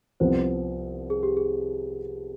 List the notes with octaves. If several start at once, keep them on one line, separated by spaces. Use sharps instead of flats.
C2 C3 F3 B3 C5
G#4
G4
G#4